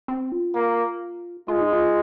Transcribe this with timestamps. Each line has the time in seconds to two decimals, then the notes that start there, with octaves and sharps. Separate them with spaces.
0.08 C4
0.32 F4
0.55 A#3
1.48 G#3 F4
1.61 D#4
1.73 F4